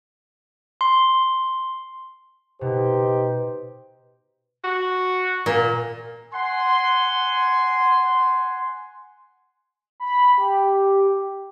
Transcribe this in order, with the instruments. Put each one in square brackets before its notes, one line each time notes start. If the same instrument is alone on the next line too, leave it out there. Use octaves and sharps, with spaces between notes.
[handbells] C6
[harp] B2 [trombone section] D#4 G4 C5
[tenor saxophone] F#4
[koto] A#2
[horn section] F#5 G#5 C6
[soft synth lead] B5
G4